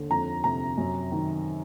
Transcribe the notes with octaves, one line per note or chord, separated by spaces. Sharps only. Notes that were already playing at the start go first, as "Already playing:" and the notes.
Already playing: D#2 D3
F2 A#5
C3 A#5
F#2
D#3